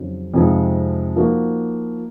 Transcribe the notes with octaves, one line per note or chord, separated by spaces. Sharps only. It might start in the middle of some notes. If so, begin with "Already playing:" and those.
Already playing: F2 C#3 F#3 C4 D#4
F2 C3 F3 G#3 D#4
F3 A#3 D#4 F#4